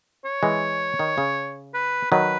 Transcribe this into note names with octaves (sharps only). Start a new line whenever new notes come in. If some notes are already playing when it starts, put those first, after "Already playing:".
C#5
E3 G#3
D#3
C#3
B4
D#3 F#3 B4